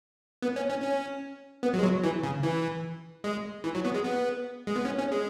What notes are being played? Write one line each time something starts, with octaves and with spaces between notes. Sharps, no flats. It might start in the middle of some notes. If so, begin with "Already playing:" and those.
B3
C#4
C#4
C#4
B3
F#3
G#3
F#3
E3
C#3
E3
G#3
E3
F#3
B3
G#3
B3
G#3
B3
C#4
C#4
G#3